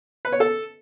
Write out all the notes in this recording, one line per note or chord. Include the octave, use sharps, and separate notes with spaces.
B4
C#5
A4